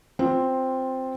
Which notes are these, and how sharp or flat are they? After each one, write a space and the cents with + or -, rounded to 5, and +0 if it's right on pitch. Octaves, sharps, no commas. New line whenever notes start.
C4 +0 F4 +10